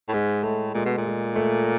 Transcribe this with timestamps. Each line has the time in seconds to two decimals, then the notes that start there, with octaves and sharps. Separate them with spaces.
0.08 A2
0.13 G#2 G#3
0.43 A2 A3
0.74 A#2 G#3
0.85 B2
0.98 A#2
1.06 G#3
1.36 A3